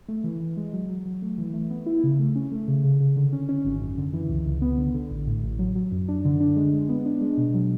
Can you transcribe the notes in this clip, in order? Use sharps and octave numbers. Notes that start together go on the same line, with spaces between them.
A3
E3
E3
G#3
F#3
F#3
F#3
A3
E3
A3
B3
E4
C#3
A3
C#4
A3
C#3
C#3
C#3
D3
C#4
C#4
G#1
F#2
D3
E3
C#2
C#2
B3
D3
D3
A1
A2
A1
F#3
F#3
F#2
D4
D3
D4
G#3
G#3
B3
D4
G#3
B2
F#3